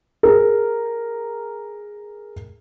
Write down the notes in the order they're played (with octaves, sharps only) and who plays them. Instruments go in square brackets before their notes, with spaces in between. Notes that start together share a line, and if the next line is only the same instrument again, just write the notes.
[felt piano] G#4 A#4